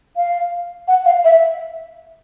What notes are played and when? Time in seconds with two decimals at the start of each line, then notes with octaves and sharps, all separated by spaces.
0.16 F5
0.88 F#5
1.05 F5
1.24 E5